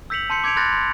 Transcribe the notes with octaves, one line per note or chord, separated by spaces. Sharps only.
E6 G6 B6 C#7 F7 F#7
A5 C6 G6 C#7
D6 G#6 C#7 D7 F7
B5 C6 F#6 G6 A6 A#6
C6